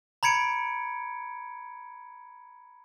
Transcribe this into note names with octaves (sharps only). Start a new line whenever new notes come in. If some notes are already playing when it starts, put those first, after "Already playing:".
A#5 B5 G#6 C#7 D7